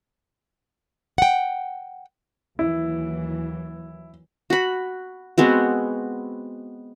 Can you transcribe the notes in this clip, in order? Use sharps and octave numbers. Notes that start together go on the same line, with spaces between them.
F#5 G5
D#2 E3 F#3 E4
F#4 B5
G#3 B3 C4 F#4